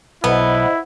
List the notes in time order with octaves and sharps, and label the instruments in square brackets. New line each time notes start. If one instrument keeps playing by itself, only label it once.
[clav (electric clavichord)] B1 A4 [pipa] B3 [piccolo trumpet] E4 [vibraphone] C5 D#5 F#5